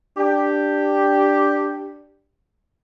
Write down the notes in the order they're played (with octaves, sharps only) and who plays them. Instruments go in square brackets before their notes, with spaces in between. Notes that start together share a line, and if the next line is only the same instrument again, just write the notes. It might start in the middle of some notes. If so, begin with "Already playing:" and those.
[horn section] D4 G4